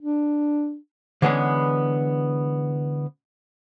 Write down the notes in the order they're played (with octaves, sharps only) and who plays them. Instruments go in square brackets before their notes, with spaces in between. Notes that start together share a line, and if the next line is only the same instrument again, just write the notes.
[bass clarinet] D4
[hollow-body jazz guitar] D3 E3 G#3 B3 C#4 G#4